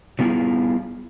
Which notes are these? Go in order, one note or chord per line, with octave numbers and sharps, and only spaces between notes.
F#3 G3 B3 E4 F4 G#4